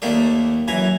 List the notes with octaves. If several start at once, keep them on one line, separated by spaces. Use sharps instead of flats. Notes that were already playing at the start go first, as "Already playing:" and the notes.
D#2 A3 A#3 G4 A4 D5
F#2 E3 E4 G#5 A#5